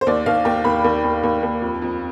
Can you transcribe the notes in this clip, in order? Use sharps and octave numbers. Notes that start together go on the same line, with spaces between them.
C5
D#2 D5
D#2 F5
D#2 G5
D#2 B5
D#2
D#2
D#2
D#2
F2
F2